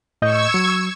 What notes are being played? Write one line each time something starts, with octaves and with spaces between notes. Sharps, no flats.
A2 D#5 C#6 E6 G6 G#6
F#3